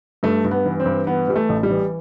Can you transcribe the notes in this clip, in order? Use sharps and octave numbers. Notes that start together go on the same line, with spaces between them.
G2 A3
G2
B3
E3
C4
G2
E3 B3
E3 G3
A3
A1
G3
E3